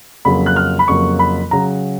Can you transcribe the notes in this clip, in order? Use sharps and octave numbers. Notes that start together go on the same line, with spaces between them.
F2 C#3 F#3 A#3 B5
F#6
F6
B5
F2 C#3 F#3 A#3 C#6
B5
C#3 F#3 A#5